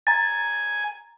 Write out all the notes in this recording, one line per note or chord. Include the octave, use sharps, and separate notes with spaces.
G#5 A#5 A6